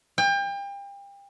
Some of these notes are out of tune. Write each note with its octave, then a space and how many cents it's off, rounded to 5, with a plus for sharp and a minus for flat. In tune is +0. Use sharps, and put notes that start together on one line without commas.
G5 +35